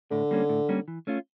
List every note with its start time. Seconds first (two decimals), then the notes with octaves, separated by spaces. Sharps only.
0.11 A2 D3
0.31 G3 A#3 C#4
0.49 A2
0.69 G3 A#3 C#4
0.88 E3
1.07 A3 C#4 F4